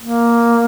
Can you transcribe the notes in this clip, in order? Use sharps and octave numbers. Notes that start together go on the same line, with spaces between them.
A#3